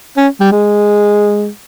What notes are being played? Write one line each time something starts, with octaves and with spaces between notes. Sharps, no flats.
C#4
G3
G#3